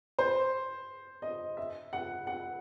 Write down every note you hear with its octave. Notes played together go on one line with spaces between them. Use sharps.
C5
D#5
E5
F#5
F#5